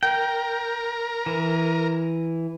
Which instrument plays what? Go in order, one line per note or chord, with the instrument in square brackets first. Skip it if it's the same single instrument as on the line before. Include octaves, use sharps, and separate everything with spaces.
[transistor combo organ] A#4 [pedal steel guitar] G5
[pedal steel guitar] E3